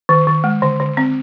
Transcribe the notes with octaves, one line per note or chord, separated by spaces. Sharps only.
D#3
D#3
G#3
D3
D3
C4